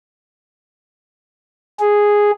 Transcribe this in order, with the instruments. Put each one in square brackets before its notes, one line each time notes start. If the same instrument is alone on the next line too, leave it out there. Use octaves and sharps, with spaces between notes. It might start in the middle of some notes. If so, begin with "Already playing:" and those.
[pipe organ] G#4